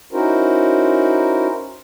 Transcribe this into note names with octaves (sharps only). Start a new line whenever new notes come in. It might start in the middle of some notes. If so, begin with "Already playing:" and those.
C#4 D#4 E4 F#4 A#4 C5